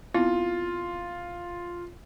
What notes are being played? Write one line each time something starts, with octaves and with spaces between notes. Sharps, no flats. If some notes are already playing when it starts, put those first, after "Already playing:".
B3 C4 E4 F4